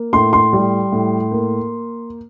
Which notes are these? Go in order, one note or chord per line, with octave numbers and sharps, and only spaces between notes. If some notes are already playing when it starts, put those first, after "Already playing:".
Already playing: A#3
A2 C6
C6
G3
A2
A#3